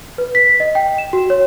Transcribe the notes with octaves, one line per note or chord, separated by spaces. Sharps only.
B4
B6
D#5
G5
E7
F#4
C#5